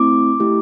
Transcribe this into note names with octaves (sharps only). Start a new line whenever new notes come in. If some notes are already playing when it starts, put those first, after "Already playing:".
Already playing: A3 C4 E4 D6
A3 E4 G4